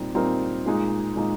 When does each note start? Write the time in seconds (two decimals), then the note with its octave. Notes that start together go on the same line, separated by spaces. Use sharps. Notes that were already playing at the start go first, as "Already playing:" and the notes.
Already playing: A#2 G3 C4 D#4
0.15 A#2 G3 C4 D#4 A#4
0.66 A#2 G#3 D#4
1.16 A#2 G#3 D#4